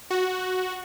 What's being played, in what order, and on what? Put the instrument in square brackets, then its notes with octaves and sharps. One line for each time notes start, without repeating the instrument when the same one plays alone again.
[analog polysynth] F#4